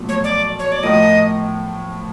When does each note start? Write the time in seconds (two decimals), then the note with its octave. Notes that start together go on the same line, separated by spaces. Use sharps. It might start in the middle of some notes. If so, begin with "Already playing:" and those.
Already playing: B1 A#2 F3 A3
0.09 C#5
0.24 D5
0.59 C#5
0.72 D5
0.83 A2 F3 A#3 D#5